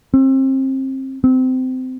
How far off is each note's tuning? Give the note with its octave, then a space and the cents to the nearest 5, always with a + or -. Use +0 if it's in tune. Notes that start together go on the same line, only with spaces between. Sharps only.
C4 +30
C4 -25